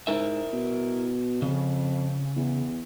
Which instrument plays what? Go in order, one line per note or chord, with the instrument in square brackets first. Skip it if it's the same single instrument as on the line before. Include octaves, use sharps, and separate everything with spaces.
[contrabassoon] G#2 [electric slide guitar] E4 A#4 E5
[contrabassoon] B2
[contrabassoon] F2 [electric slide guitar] C#3
[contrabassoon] E2